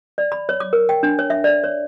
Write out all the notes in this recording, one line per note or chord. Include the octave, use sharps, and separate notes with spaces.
D5
B5
C#5
D6
A#4
G5
D4
C#5
E5
D5
C#5